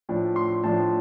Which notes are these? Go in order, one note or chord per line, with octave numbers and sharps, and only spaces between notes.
A2 F3 D4
C6
A2 F3 D4 A5